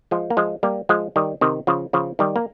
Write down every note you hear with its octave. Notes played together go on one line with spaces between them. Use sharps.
F3 G#3
A#3
F3 G#3
G3 A#3
F3 G#3
D#3 G3
C3 D#3
C#3 F3
C#3 F3
D#3 G3
A#3